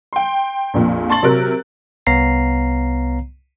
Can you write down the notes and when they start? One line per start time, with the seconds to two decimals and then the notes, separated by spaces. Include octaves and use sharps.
0.13 G5 C6
0.74 A#1 F2 A#2
1.10 A5 C6 C#6 A6 F#7
1.23 C3 F#3 A#4 F#6
2.07 C2 B3 C#5 F5 A#5 C7